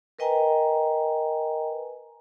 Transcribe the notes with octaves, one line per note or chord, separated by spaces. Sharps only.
A#4 B4 D#5 G5 G#5 A#5